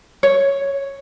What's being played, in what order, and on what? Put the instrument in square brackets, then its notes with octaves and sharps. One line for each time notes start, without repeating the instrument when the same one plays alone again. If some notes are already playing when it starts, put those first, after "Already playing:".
[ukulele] C#5